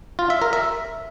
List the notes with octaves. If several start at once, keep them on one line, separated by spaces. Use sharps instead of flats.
F4
E5
A#4
E5